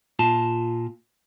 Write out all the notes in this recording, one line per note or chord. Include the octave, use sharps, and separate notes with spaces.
A#2 F4 A5